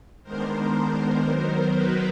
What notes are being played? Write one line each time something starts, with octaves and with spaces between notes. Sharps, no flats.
D#3 G#3 B3 D4 A#4 C5
D#3 F#3 B3 A#4 C5
B4